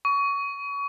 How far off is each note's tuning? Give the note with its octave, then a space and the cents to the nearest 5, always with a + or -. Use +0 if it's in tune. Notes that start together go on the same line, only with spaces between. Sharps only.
C#6 +25